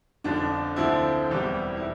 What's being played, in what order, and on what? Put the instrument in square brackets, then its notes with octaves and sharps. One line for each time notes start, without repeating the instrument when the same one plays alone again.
[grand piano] G1 F2 D3 F3 D4
D2 D3 F3 C4 E4
E1 E2 E3 G3
E4